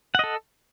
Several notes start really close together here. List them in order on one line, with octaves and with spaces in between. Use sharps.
F#5 D#5 A4